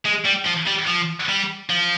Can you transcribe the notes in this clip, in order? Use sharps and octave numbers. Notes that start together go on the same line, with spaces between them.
G#3
G3
F3
G3
F3
G3
F3